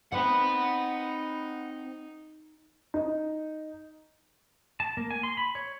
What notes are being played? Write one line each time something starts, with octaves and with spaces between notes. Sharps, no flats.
C4 D#4 F#5 B5
D#4
A5
A#3
G#5
C6
B5
C#5